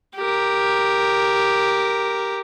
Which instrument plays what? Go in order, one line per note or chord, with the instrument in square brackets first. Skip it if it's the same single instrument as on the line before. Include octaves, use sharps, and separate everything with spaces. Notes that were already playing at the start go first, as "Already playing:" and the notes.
[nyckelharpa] G4 A#4